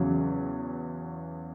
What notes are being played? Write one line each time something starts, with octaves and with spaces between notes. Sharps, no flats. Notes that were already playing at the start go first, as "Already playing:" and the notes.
Already playing: E2 C#3 F#3